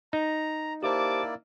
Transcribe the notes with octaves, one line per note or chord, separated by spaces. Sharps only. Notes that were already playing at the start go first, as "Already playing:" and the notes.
D#4 A#5
A#3 E4 G4 C5 D5 A5 D6